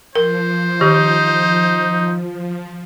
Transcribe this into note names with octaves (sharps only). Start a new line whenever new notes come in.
F3 A#4 C5
D#3 D#4 G4